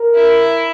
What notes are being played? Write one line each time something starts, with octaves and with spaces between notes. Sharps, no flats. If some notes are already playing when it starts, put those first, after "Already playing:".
Already playing: A#4
E4